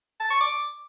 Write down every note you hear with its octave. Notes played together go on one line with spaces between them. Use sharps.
A5
C#6
D6